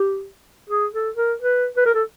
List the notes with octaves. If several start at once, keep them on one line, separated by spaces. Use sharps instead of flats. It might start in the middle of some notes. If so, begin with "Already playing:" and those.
Already playing: G4
G#4
A4
A#4
B4
B4
A#4
A4